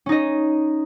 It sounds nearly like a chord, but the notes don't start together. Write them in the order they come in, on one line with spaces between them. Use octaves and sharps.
C#4 D#4 D#5